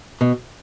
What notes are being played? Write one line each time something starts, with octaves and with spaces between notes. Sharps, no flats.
B2